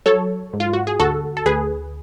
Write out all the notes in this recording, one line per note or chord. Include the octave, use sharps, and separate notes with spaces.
F#3 A4 C#5
G#2
F4
F#4
G#4
D2 F#4 A4
A4
D2 G#4 B4